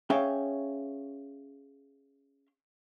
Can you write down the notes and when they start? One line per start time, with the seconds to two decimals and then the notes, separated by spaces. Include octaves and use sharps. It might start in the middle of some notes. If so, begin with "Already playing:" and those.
0.10 C#4 G#4 C#5 E5 F5 G5